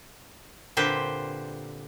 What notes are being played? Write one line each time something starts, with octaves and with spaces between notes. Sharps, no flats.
A#2 D3 C4 G4 B4 C5